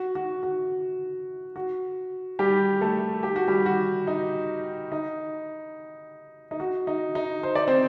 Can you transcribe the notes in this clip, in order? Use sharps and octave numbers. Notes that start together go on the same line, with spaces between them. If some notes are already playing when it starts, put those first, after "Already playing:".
Already playing: F#4
F#4
F#4
F#4
G3 G4
A3 A4
G4
F#4
G3 G4
F#4
D#4
D#4
D#4
F#4
D#4
D#4
C5
D5
C4 C5